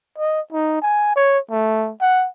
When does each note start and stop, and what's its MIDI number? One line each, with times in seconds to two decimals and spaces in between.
0.18 0.40 75
0.52 0.80 63
0.82 1.12 80
1.16 1.39 73
1.50 1.92 57
2.01 2.27 78